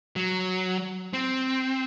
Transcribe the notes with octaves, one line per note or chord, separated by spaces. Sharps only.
F#3
C4